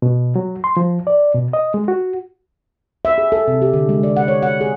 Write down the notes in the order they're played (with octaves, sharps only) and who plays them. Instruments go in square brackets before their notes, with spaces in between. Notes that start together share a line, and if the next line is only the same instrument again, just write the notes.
[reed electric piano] B2
F#3
C6
F3
D5
B2
D#5
G#3
F#4
[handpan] E5
G#4
A4
C3
G4
D3
G#3
D5
F#5
C#5
F#5
G#4